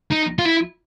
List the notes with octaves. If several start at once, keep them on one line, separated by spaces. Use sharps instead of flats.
D#4
F4
E4